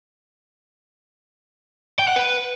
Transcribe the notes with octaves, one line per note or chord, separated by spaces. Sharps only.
G5
F#5
B4